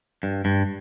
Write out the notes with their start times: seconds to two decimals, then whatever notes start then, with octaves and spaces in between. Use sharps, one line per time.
0.23 G2
0.45 G2